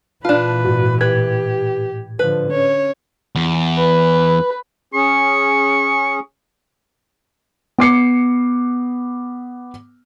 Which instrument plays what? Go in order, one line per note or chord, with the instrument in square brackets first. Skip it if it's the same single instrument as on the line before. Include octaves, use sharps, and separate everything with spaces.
[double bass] A#2 E3 [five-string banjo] D4 F4 [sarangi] B4 [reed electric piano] A5
[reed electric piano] G#2 F#4
[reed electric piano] A2 G#6 [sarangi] G4 [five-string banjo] B4
[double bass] D3 F3 [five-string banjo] B4
[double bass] C#4 [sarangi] C#5
[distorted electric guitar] E2
[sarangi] B4
[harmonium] C#4 G#4 [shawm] C#6
[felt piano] B3 D6 C7 C#7